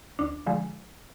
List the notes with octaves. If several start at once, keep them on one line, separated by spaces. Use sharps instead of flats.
D2 D4
D3 F3 G#3